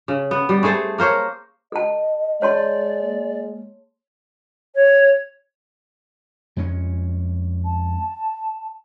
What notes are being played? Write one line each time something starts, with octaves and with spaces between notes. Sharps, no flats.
C#3
B3
G3
A3 G#4 A4 C5
A#3 A#4 C5 C#5
A4 D#5 A5
G#3 C#5 D5 A5 C6
A#3
C#5
F2 G#3 C#4
A5